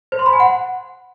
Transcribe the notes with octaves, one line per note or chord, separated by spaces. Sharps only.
C5
C6
B5
G#5
F#5